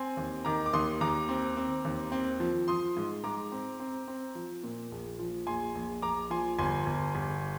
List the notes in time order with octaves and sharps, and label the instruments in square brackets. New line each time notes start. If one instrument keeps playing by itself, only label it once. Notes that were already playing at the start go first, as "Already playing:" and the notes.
Already playing: [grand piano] C4 G#5 C6
D#2
D#3 A#5 D6
D6
D#2 C6 D#6
D#2 A#5 D6
C4
C4
D#2
C4
F3
F3 C6 D#6
G#2
G#2 A#5 D6
C4
C4
C4
F3
A#2
A#1
F3
A#1 G#5 C6
A#1
A#1 A#5 D6
F3 G#5 C6
G1 G#5 C6
G1
G1